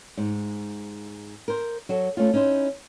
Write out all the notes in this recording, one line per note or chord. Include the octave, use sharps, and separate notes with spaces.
G#2
A#4 C5
F#3 F#4 A4
A3 C#4 F4
C#4 D#4 E4 C5